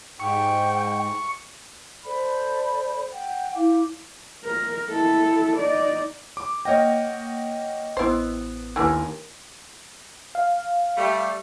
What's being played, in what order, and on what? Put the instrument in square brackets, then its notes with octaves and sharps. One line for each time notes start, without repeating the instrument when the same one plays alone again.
[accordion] G#2 [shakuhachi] G5 [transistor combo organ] C#6
[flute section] A4 C5 D5 B5
F#5 G5
E4 F5 D6
[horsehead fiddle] A#4
E4 A4
D#4 D5
[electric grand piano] D6
[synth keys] A#3 F#5 A#6 [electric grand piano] C#5 D#5 G5
[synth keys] A1 B3 [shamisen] E4 C5
[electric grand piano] D#2 A#4 G#5 [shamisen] D3 E3
[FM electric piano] F5
[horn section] G3 A3